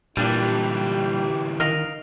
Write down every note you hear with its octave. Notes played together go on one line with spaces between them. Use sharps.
A#2 D3 E3 G3 D4 D#4 G4
D#3 A#4 D#5 F5